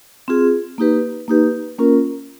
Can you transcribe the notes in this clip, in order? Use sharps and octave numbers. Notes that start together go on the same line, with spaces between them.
C4 F4 G#4
A#3 D#4 G4 B4
A#3 D#4 G4 B4
A#3 C#4 F4 A#4